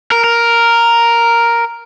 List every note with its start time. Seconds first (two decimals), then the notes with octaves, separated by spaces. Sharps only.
0.12 A#4
0.24 A#4